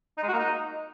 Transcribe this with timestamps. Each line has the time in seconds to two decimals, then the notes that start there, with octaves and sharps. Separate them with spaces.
0.18 D#4
0.23 G#3
0.28 F#4
0.33 A#3
0.39 D#4